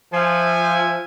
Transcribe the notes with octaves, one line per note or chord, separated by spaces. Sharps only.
F3 E5 G#5